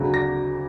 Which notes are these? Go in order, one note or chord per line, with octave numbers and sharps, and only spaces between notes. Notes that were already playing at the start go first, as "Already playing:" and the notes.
Already playing: D2 C#3 F#3
A#6